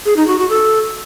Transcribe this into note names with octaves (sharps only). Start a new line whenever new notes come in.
G#4
D#4
F#4
F#4
A4